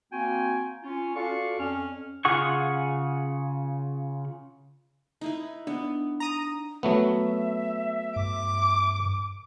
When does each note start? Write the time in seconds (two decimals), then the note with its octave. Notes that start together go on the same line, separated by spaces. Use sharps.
0.12 A#3 C4 F#4 G5 G#5
0.83 C#4 F4
1.16 F4 F#4 A4 D5 F5 C#6
1.59 F2 C#4 F6
2.25 C#3 F4 G#4 F#5 C#6
5.21 D#4 E4 B4
5.67 B3 D4
6.20 A#5 D#6
6.83 F#3 A3 B3 E5
8.16 G2 D6